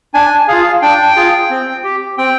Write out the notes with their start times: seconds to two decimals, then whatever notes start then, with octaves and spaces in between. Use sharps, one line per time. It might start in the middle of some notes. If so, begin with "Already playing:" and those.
0.14 D4 G#5
0.48 F4 G#4 F5
0.82 D4 G5
1.16 F4 G#4
1.50 C4
1.84 G4
2.18 C4 G5